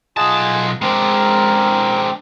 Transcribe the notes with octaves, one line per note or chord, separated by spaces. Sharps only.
B1 F4 G#4 D#5 F#5 A5
G#3 C4 D4 A#4